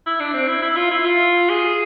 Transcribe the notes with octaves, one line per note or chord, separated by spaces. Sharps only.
E4
D4
C4
E4
E4
F4
E4
F4
G#4